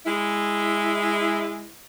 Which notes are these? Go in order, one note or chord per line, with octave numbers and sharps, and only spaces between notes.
G#3 E4